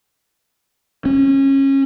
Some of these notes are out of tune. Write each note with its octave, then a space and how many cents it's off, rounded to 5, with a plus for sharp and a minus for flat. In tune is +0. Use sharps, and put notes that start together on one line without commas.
C#4 -25